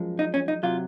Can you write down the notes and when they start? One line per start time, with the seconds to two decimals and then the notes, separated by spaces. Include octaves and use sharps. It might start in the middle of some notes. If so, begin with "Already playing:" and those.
Already playing: F#2 F3 G#3
0.19 D#4
0.34 C#4
0.48 D#4
0.63 C3 F#3 F4